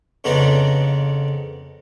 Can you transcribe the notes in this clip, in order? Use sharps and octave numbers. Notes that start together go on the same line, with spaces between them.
F2 C#3 B3 D4 D#4